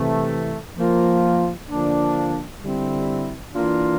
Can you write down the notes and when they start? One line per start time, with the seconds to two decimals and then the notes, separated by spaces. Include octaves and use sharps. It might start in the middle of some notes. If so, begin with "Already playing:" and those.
Already playing: C3 E3 A3
0.78 F3 A#3 F4
1.70 D3 F3 A#3 D4
2.62 D3 G3 C4 E4
3.54 E3 A#3 D4 F4